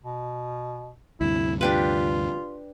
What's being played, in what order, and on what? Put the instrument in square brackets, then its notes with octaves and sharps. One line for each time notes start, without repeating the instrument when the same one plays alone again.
[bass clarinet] B2
[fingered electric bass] D2 G2 C3 [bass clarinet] E4
[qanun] D4 G4 B4 [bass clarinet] F4